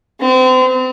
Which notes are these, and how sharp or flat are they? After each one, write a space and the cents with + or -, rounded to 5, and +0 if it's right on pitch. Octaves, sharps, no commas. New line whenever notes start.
C4 -35